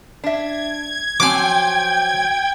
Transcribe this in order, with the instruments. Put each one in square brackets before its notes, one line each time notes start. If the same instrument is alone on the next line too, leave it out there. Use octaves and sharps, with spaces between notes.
[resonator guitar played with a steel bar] D4 E5 [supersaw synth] G#6
[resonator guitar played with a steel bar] F3 F#3 C4 [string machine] G5 [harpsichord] G#5 D6